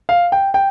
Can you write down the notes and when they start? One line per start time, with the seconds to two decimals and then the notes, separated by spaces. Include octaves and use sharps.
0.09 F5
0.32 G5
0.54 G5